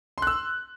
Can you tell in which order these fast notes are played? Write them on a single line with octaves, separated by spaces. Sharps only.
C6 F#6 E6